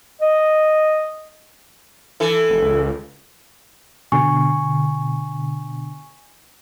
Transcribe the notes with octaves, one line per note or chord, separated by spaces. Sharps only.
D#5
E3 A4
F1
C#2
B2 D3 G#5 C#6